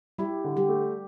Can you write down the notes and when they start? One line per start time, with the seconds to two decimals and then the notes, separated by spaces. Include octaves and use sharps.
0.18 G3 E4 G4
0.44 D3
0.57 G3 G4
0.69 A3